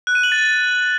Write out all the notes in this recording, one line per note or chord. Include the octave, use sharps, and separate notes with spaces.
F#6
D#7
F#7
A6